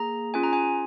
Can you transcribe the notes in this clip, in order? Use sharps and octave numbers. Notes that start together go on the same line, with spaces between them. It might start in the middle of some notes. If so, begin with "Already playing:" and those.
Already playing: A#3 G#4 A#5
C#4 F4 G#4 G#5
A#5
G#5